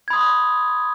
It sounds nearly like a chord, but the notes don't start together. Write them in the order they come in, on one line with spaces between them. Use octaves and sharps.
G#6 B5 D#6 C6